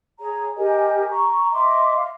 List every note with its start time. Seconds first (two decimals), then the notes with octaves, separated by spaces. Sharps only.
0.19 G#4 C#5 A#5
0.57 G4 A#4 D#5 G#5
1.09 A#5 C#6
1.52 D#5 E5 C6 D6
1.96 F5